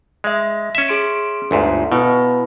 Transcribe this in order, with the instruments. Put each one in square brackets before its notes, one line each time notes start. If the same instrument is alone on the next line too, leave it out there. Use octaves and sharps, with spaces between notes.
[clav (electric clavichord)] G#3 [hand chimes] D#5 E5
[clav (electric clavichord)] C#4 E5
[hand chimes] G#4 C6 D7
[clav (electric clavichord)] G1 D2 G#2
[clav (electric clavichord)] B2 [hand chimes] B3 E4 B4